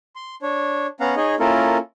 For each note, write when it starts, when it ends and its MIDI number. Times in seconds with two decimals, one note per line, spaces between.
0.16 0.35 84
0.42 0.87 62
0.42 0.87 73
1.00 1.15 59
1.00 1.15 61
1.00 1.15 77
1.00 1.15 78
1.00 1.15 82
1.17 1.35 63
1.17 1.35 68
1.17 1.35 73
1.17 1.35 75
1.39 1.78 58
1.39 1.78 61
1.39 1.78 64
1.39 1.78 65
1.39 1.78 69
1.39 1.78 70